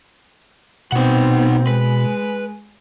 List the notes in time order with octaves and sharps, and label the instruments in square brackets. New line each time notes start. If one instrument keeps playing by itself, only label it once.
[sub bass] B2 [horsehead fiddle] B3 C4 [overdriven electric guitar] D#4 F#5
[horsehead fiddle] G#3 [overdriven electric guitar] B4